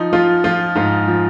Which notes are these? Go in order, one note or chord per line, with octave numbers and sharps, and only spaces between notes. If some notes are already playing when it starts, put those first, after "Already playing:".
Already playing: F3 D#4
F3 F4
F3 F4
G#2 F4
F3